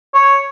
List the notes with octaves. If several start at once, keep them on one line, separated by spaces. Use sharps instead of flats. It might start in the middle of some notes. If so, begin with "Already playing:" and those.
C#5